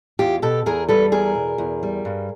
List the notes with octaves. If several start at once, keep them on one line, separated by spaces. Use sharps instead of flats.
E2 F4 G4
B2 G4 A4
E2 G#4 A#4
G3 A4 B4
E2 G#4 A#4
B2
E2
G3
G2